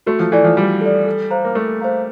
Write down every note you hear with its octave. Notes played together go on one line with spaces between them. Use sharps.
A3 F#4
F3
E3 A4 D5
F3
G3 F#4
A4 D5
A4
C5 F5 A#5
A#3
A3 A4
C5 F5 A#5